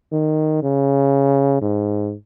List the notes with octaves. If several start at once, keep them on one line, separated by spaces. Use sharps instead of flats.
D#3
C#3
G#2